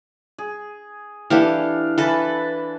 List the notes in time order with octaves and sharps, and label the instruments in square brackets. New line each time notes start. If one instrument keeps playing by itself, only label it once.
[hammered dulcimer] G#4
[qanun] E3 G4 A4 [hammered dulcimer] D4 F5
[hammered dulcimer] E3 A5 B5 [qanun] A4 B4